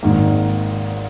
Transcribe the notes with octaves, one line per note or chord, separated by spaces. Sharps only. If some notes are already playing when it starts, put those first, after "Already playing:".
G#1 G#2 D#3 A#3